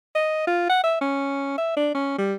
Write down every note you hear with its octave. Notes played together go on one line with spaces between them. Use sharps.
D#5
F4
F#5
E5
C#4
E5
D4
C#4
G3